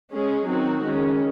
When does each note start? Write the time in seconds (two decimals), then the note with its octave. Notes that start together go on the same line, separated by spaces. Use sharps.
0.09 G#3 C#4 G#4
0.46 D#3 F#3 C4 D#4 F#4
0.83 D#3 G#3 C#4